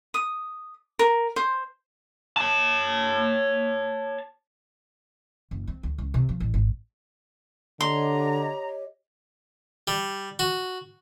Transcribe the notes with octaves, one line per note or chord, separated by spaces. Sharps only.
D#6
A#4
C5
C#5 A5
F#1
C4
D2
C#2
C3
F3
A1
G#1
D3 G4 C#5 D#5 A#5 C6
G3
F#4